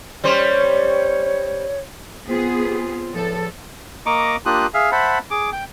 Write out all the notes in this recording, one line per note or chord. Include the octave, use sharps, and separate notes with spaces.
G3 C#4 C5 C#5
B3 C4 F4 G#4
E2 A2 F3 A4
A#3 D#5 A#5 C#6 D6
A#3 D4 F4 G4 D#6 F#6
G#4 E5 F5
C5 E5 F#5 A5 B5
G#4 D6
G5